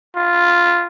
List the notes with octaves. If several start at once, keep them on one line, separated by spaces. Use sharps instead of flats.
F4